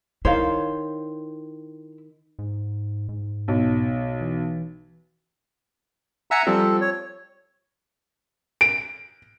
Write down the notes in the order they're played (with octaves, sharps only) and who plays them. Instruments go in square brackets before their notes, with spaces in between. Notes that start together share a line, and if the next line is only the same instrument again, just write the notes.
[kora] D#3 C5 [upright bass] E4 [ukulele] C#5 F5
[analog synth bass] G#2
G#2
[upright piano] B1
[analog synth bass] E3
[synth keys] E5 G#5 C#7 [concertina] F#5 A#5
[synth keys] F3 G3 C4 [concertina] A4
[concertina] C#5
[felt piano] D7